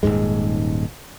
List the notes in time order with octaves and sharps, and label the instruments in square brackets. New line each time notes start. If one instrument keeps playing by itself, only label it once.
[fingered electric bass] D#1 C#2 G#2 G#3